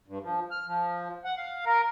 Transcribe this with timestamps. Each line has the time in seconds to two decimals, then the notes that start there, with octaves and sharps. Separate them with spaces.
0.07 G2
0.22 F3
0.51 F6
0.66 F3
1.24 F#5
1.37 F5
1.66 A#4